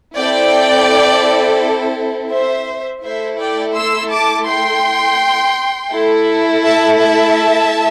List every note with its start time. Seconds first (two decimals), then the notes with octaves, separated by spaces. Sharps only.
0.16 C4 E4 A4 D5 G5
2.32 C5 E5
3.04 A3 E4 A4 C5 E5
3.40 D5 G5
3.76 C6 E6
4.12 A5 D6
4.48 G5 C6
5.92 A3 E4 A4
6.64 E5 A5
7.00 E5 A5